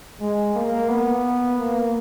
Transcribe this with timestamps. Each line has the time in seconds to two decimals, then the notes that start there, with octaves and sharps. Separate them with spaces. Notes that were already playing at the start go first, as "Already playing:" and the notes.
0.20 G#3
0.55 A#3
0.89 B3
1.59 A#3